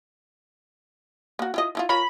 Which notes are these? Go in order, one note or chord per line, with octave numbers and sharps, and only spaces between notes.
A#3 F#4
E4 F4 D#5
F3 E4 F4
F4 A#4 C#5 B5